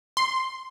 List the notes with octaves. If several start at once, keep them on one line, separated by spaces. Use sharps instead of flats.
C6